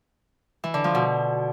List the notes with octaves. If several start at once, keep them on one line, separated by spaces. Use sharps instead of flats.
E3
D3
F3
B2